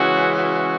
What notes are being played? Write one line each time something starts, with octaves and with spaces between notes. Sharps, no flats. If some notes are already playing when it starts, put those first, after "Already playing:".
Already playing: C#3 E3 G#3 C#4 E4 F#4
F#4